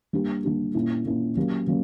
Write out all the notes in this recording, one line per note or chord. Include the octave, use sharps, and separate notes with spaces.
G3 A#3 D4 G4
G3 A#3 D4 G4
A#2 A#3 C#4 E4
A#2 A#3 C#4 E4
F#3 A#3 C#4 G4
F#3 A#3 C#4